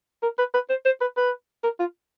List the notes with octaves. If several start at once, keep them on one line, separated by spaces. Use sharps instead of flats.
A#4
B4
B4
C5
C5
B4
B4
A#4
F4